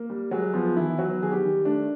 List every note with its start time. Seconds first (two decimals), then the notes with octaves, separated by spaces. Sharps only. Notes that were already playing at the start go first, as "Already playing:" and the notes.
Already playing: A#3
0.10 G3
0.31 F#3 G#3 F#4
0.54 F3 B3 F4
0.76 D#3 E3 E4
0.98 F#3 B3 F#4
1.21 D#3 G#4
1.32 G3 G4
1.44 D#3
1.65 A3 D4